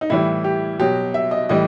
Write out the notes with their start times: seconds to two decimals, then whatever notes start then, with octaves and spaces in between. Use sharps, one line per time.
0.01 D#4
0.10 A2 E3 G3 E4
0.44 G4
0.79 B2 F#3 G4
1.14 E5
1.31 D#5
1.49 A2 E3 G3 D#5